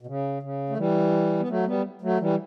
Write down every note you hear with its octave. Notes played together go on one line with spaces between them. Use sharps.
B2
C#3
C#3
A3
E3 G3
B3
F#3 A3
G3 B3
F#3 A3
E3 G3